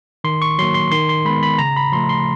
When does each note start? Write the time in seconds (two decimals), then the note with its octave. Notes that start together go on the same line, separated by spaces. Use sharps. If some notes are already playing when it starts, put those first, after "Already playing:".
0.24 D#3 C6
0.42 C#6
0.59 F#3 A#3 C6
0.74 C6
0.92 D#3 C6
1.09 C6
1.25 G#3 B3 B5
1.43 B5
1.59 C#3 A#5
1.77 B5
1.92 F3 A3 C6
2.09 C6